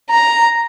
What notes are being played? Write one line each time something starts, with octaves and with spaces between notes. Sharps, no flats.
A#5